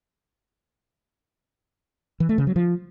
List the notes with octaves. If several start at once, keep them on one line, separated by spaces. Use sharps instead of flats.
E3
A3
C#3
F#3
F3